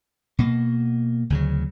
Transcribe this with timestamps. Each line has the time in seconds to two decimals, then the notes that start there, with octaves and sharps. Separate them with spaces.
0.39 B2 A#3
1.30 D2 C#3 F#3